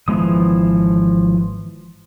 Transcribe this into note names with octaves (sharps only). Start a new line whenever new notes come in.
G#1 E3 F3 G#3 B3 D#6